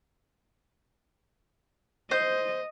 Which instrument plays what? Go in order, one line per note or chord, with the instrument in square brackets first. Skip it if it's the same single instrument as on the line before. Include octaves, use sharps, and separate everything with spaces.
[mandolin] C5 G6 [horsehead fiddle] D#5